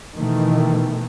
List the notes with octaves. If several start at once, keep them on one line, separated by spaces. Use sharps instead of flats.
B2 D#3 E3 A3